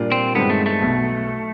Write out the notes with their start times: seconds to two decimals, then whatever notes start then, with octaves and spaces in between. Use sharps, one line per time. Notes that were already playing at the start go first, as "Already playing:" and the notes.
Already playing: A#2 G3 A#3 D4 F4
0.12 C4
0.35 G2 D#3 G#3 B3 C4
0.50 A3
0.66 A3
0.81 B1 B2 F#3